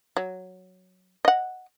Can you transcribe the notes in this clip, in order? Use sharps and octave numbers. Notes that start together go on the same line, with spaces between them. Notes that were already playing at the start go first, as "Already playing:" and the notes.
F#3
D#5 F#5